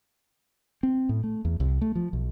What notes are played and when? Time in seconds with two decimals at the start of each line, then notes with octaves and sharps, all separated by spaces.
0.83 C4
1.09 A2
1.24 A3
1.45 E2
1.60 C2
1.81 A3
1.95 F3
2.13 B1